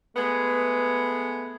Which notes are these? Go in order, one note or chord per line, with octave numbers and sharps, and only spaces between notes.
G#3 A3 B3